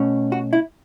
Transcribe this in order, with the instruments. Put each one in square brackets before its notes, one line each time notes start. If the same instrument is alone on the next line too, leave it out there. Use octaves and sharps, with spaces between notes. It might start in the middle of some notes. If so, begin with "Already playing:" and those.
Already playing: [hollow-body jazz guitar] B2 A3 C#4
F#4
E4